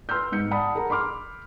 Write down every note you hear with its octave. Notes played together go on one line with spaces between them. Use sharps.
B4 C6 E6 F6 G6
G#2 G6 C#7
D5 F#5 A5 B5 D#6
G#4 A#4 F#5 A#5
B5 C6 D6 F6